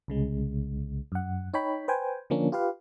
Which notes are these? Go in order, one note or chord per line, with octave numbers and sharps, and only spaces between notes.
C2 C#3 G#3
F#2 F#5
D#4 C#5 G5 B5
B4 C5 G5 G#5
D3 F3 A#3 C#4 D4
F4 G4 B4 F5